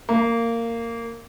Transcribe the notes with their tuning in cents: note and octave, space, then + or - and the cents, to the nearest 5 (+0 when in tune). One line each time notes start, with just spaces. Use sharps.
A#3 -15